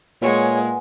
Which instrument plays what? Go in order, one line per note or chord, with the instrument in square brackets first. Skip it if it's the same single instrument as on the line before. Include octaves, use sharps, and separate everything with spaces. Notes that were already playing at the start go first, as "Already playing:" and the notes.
[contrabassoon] A#2 [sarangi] G#3 [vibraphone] B4 F#5 G#5 [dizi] C#5